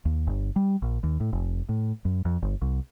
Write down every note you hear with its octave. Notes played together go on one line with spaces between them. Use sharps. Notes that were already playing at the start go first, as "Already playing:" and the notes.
D#2
G1
G3
A#1
D#2
A2
F1
A2
F#2
F2
G1
C2